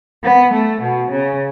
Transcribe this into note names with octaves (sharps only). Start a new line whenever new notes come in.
B3
A3
B2
C#3